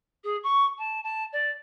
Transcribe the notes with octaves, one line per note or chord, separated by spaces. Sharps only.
G#4
C#6
A5
A5
D5